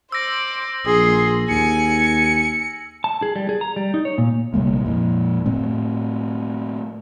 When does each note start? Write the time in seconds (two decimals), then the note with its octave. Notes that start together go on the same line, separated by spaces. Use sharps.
0.12 C5 D6 E6 A#6
0.86 A#1 G#4 C6
1.49 D#2 G#5 C#7
3.04 A5
3.22 G#4
3.36 G3
3.49 G#4
3.61 A#5
3.76 G3
3.94 D#4
4.05 C#5
4.18 A#2
4.54 A#1 C3 G3 A#3
4.85 F2 A#2
5.46 A2 A3 C4